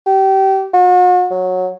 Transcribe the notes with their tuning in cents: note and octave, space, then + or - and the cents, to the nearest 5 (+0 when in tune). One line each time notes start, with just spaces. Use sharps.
G4 -30
F#4 -45
F#3 -10